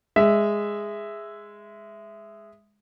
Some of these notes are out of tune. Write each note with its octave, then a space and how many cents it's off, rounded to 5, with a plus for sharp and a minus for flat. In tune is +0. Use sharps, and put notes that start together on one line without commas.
G#3 -10 E5 +0